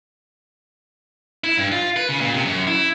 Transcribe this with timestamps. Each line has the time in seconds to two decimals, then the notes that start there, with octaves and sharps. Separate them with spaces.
1.44 E4
1.58 G2
1.72 F4
1.96 B4
2.08 C#3
2.21 A#2
2.34 C3
2.45 F#2
2.67 E4